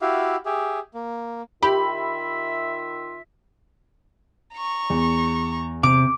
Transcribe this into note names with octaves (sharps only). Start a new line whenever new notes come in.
E4 F#4 G4 E5 F5
G4 G#4 E5
A#3
D#3 F4 G4 E5 B5
A#5 C#6
E2
C3 D6